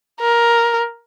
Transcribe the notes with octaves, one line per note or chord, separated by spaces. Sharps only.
A#4